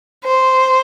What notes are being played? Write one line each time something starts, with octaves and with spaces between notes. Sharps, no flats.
C5